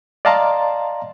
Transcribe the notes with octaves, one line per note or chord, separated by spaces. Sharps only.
D5 D#5 F5 A5 A#5 C6